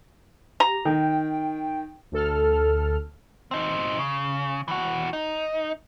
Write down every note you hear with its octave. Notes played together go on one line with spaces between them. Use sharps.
G4 A#5
D#3 G5
D2 A4 F6
C4 D#4
C#3
E3 F#4
D#4